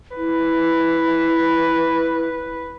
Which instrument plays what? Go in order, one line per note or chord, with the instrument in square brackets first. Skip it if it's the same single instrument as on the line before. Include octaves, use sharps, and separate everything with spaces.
[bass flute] E4 [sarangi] B4